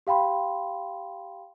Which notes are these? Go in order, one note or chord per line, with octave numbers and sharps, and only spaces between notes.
G4 F5 G5 B5 C6